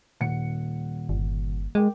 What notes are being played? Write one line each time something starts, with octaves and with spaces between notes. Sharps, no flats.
D#1 F#5 C#7
G1
G#3 A#4 G5 D6